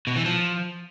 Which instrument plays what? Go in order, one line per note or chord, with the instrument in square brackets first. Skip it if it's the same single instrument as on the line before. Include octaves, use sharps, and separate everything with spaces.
[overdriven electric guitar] B2
E3
F3